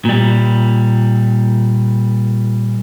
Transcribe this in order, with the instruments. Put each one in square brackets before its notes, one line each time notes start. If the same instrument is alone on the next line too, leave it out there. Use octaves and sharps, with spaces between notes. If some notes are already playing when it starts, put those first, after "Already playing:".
[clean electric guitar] A#2 G3